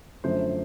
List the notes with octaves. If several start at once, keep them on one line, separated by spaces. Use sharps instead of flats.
F#2 D3 F3 A3 C5